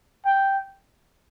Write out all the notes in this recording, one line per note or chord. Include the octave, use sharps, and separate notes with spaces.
G5